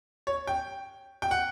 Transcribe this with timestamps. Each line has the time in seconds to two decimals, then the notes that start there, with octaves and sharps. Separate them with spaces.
0.27 C#5
0.47 G5
1.22 G5
1.31 F#5